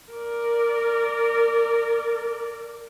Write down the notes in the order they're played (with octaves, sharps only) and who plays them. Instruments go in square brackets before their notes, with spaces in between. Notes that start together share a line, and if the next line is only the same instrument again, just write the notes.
[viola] A#4 D5